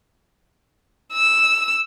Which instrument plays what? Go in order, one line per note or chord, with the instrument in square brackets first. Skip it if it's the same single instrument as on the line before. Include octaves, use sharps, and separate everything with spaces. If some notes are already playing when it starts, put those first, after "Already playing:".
[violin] E6